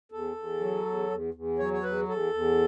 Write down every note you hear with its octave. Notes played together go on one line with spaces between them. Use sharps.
E2 A4
E2
F#3
E2
E2
E2
F#3 C#5
C#5
E2 B4
E2 A4
E2